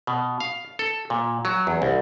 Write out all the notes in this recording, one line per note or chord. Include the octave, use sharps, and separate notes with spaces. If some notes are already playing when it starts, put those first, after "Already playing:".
B2
F5
A4
A#2
F#3
E2
C2